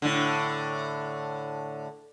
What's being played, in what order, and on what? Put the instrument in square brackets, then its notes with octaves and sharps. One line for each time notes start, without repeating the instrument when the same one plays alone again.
[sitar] A2 D3